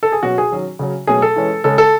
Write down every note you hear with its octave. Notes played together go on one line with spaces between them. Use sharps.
A4
G#4
B2 F#3 C#4 F#4
G#4
D#3 F#3 C#4
C#3 F#3 C#4
B2 F#3 A3 C#4 G#4
A4
E3 G#3 C#4
C#3 G#3 C#4 A4
A4